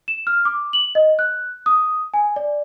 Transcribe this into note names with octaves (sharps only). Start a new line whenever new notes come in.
E7
F6
D6
F#7
D#5
F#6
D#6
G#5
D5